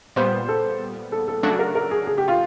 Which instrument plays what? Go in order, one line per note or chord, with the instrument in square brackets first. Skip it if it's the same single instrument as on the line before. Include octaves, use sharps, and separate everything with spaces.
[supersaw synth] A#2 G3 B3 [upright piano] C5
[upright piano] A4
A4
A4
[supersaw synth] C#3 F#3 A3 D4 F#4 [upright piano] A4
[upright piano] A#4
A#4
G#4
G#4
G4
F4